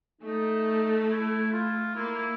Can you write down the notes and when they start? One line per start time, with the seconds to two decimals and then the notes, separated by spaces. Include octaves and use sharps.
0.21 A3 D#4
1.09 E4
1.52 F4
1.95 A#3 E4